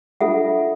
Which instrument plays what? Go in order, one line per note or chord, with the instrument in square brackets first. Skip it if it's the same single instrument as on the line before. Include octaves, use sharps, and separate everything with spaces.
[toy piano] D4 F4 A4 E5 F#5